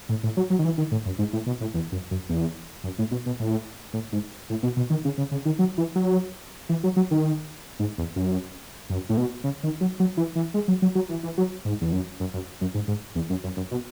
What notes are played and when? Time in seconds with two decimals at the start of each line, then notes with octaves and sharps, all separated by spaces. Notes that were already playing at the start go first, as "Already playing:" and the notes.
0.09 A2
0.23 A2
0.37 F#3
0.50 F#3
0.59 D#3
0.65 E3
0.78 D#3
0.91 A2
1.06 F#2
1.19 G#2
1.33 A2
1.46 B2
1.61 A2
1.74 E2
1.92 F#2
2.11 F#2
2.29 E2
2.84 F#2
2.99 A2
3.11 B2
3.26 B2
3.39 A2
3.94 A2
4.12 G#2
4.50 A2
4.63 B2
4.77 B2
4.90 D#3
5.05 C#3
5.18 C#3
5.32 C#3
5.45 D#3
5.59 F#3
5.78 E3
5.95 F#3
6.69 E3
6.84 F#3
6.96 F#3
7.11 D#3
7.79 G#2
7.98 E2
8.16 F#2
8.90 F#2
9.09 A2
9.17 B2
9.44 C#3
9.63 D#3
9.81 F#3
10.00 F#3
10.17 E3
10.36 E3
10.54 G#3
10.68 F#3
10.82 F#3
10.95 F#3
11.09 E3
11.23 E3
11.38 F#3
11.65 G#2
11.81 E2
11.92 F#2
12.20 F#2
12.33 F#2
12.61 F#2
12.74 G#2
12.88 G#2
13.15 E2
13.30 F#2
13.44 F#2
13.57 F#2
13.71 B2